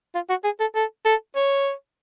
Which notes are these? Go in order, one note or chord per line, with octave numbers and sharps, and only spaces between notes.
F4
F#4
G#4
A4
A4
A4
C#5